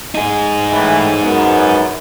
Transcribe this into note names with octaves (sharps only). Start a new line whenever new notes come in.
D#4 G#4
A2 E3
F#2 B3